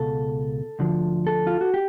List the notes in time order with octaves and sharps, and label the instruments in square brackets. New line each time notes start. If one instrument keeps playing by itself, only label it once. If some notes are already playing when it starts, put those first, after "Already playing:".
Already playing: [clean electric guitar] C#2 B2 A4
D2 D3 F3
A4
F4
F#4
G4